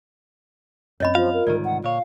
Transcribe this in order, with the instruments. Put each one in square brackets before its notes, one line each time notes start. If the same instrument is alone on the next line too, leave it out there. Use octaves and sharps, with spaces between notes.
[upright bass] F#2 C4 [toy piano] C#5 D#5 B5
[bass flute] F3 [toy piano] F4 [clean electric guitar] F5
[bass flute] A#4
[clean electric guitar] C2 G#2 D#3 [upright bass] D3 [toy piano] D5
[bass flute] F#5
[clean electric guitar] A#2 C#5 [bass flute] F5